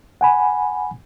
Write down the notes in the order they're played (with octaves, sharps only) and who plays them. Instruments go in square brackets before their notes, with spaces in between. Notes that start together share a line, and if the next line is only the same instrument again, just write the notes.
[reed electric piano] F#5 G#5 B5